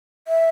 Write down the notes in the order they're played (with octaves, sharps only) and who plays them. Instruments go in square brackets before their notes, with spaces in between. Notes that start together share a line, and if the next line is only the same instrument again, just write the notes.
[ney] E5